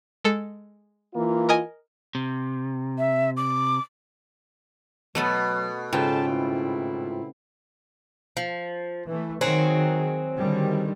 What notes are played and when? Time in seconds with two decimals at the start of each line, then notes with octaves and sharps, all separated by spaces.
0.24 G#3 A4
1.14 E3 A#3 F4
1.49 A#4 D#5 G#5
2.15 C3
2.98 E5
3.36 D6
5.15 B2 F#3 A3 B3 A4
5.93 G#2 C#3 F4 A4 B4 G5 A5
6.28 A2 C4 E4
8.37 F3
9.07 E3 A3
9.41 D#3 F#3 C4 G#4
10.37 D3 D#3 G3